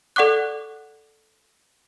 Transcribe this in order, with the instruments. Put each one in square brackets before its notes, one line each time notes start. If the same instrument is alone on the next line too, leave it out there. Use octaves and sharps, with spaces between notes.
[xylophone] A4 D5 F#5 C#6 D6 F#6